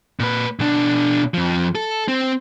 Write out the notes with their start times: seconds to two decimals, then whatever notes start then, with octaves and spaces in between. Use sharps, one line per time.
0.20 A#2 B4
0.60 B2 D4
1.34 F2 F3
1.75 A4
2.08 C4